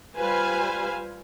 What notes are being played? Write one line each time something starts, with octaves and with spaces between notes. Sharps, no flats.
G3 F4 B4 C5 F5 G#5